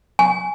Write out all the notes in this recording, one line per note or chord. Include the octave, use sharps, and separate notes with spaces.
G#5